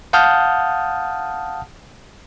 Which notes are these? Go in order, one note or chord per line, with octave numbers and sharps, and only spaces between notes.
F5 F#5 A5 D#6 F6 G6